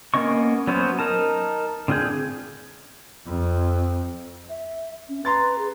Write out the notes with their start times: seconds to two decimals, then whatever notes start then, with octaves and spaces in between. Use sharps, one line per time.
0.14 A#3 B3 C#4 D#5 C#6
0.67 F#3 B3 C#4 C5
0.99 D#4 A#4 A5
1.88 D3 C4 F4 G#4 G6
3.26 F2
4.49 E5
5.09 C#4
5.25 B4 A#5 C6 A6
5.58 G#4